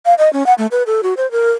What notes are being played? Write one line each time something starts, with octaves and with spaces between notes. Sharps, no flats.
F5
D#5
C#4
F#5
A3
B4
A4
F#4
C5
A#4